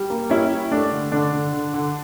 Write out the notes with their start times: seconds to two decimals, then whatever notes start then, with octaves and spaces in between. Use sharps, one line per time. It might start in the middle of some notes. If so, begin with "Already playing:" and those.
Already playing: G3
0.10 A#3
0.30 G3 C#4 E4
0.51 G3
0.71 A3 D4
0.91 D3
1.12 D3 D4
1.33 D3
1.53 D3
1.74 D3